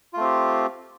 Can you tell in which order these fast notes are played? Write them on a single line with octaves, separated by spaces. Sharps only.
F4 A3 C4 G4